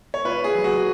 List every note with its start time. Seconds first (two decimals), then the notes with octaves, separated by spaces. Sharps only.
0.14 C#5
0.25 F4 B4
0.44 G#4
0.55 F#3
0.64 F#4